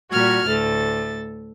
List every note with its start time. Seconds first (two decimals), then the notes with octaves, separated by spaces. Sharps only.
0.11 A#2 G3 F#4 F6 G#6
0.46 D2 A2 A4 A6